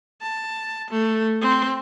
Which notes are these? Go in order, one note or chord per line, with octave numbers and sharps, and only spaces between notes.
A5
A3
C4